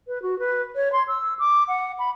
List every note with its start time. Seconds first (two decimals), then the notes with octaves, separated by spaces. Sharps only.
0.07 B4
0.22 F#4
0.39 B4
0.76 C#5
0.92 C6
1.08 E6
1.39 D6
1.68 F#5
1.99 B5